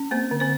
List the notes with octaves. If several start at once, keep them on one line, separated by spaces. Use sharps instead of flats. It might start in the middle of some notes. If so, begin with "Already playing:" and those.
Already playing: C#4
A#3 C4 C5
D3
C4 C5